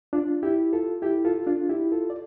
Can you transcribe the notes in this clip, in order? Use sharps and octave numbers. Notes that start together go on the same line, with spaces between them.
D4 F4
E4 G4
F4 A4
E4 G4
F4 A4
D4 F4
E4 G4
F4 A4
D5